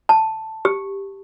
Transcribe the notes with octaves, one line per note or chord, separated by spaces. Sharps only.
A5
G4